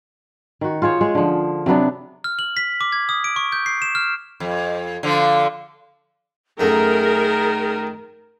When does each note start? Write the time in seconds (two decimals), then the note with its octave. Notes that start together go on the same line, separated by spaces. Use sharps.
0.61 D#3 F#4
0.82 F4 G#4 C5 C#5
1.01 G#3 G#4
1.15 D3 F3
1.66 C3 F#3 B3 D4
2.24 F6
2.39 F#7
2.57 B6
2.81 D6
2.92 G#6
3.09 D#6
3.24 D7
3.36 C#6
3.52 G6
3.66 C7
3.82 E7
3.95 F6
4.40 F2
5.03 D3 F3
6.60 F#2 D#3 A3 G#4 A#4